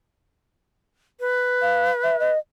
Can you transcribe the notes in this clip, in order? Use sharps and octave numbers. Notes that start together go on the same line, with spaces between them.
B4
F5
E5
D#5